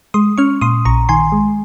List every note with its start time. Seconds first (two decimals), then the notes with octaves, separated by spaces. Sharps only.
0.14 G#3 C6 D#6
0.38 C#4 C#6 F6
0.61 A#2 C6 D#6
0.85 A#1 A#5 C#6
1.09 D#3 G#5 C6
1.32 G#3